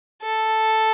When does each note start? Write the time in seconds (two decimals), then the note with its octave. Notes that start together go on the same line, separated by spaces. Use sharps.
0.23 A4